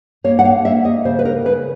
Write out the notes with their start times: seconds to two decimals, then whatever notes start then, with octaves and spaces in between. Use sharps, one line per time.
0.24 A#3 C#5
0.39 F#5
0.45 F5
0.65 A#3 E5
0.85 D#5
1.05 C#3 C5
1.19 B4
1.25 A#4
1.45 C#3 B4